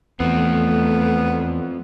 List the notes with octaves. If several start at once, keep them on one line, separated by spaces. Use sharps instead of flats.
E2 F3 A3 B3 C4